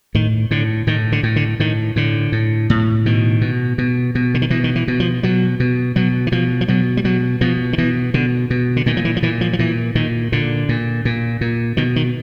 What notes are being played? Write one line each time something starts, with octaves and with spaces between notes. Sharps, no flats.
A2 D#3
A2 D3
A2 D#3
D3
A2
D3
A2 D#3
A2 D3
A2
A2
B2 D#3
B2
B2
B2
D3
D#3
B2 E3
D#3
E3
B2
F3
B2 F#3
B2
B2 F#3
E3
B2 F3
F3
B2 F#3
G3
B2 F#3
B2 F3
D#3
B2 E3
B2 D3
B2
D3
A#2 D#3
F3
E3
F3
A#2 E3
F3
F3
A#2 E3
A#2 D#3
A#2 D3
A#2
A#2
A#2
B2 D#3
D#3